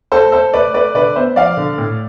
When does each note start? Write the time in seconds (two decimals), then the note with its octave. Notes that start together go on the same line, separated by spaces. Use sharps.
0.12 A3 A4 C5
0.32 A3 A4 C5
0.53 A3 B4 D5
0.74 A3 B4 D5
0.95 D3 B4 D5
1.16 B3 C5 E5
1.36 F3 D5 F5
1.57 D3
1.78 A2